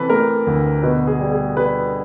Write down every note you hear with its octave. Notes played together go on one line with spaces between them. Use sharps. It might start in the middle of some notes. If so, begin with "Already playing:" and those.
Already playing: C3 E3 A4 B4
A3 A#4
D2
B2 B4
G#4
G3
G#4
G3 B4